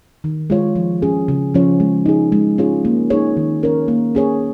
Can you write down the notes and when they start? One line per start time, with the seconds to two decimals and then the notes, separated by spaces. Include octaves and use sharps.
0.24 D#3
0.50 G#3 F4 C#5
0.75 F3
1.02 C#4 G#4
1.28 C#3
1.54 F3 C#4 F4 C#5
1.80 G#3
2.06 D#4 G#4
2.32 G#3
2.58 C#4 F4 G#4 C#5
2.85 A#3
3.10 D#4 G#4 C#5
3.37 D#3
3.63 C#4 A#4 C#5
3.88 A#3
4.15 C#4 G#4 C#5